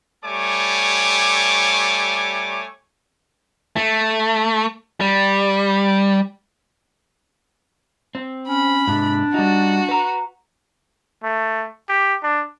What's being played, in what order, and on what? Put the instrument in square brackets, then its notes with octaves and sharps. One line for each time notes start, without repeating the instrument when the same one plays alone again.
[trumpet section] G3 A3 C#5 G#5 C#6 D6
[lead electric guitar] A3
G3
[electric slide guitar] C4
[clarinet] C#4 [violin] B5
[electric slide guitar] G#2 C3 [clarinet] D4
[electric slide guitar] G3 D#4 [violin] F#4
[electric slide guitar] B4 A#5
[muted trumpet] A3
G4
D4